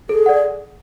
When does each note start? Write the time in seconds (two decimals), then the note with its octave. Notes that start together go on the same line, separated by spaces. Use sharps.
0.09 G#4 A4
0.26 D5 F#5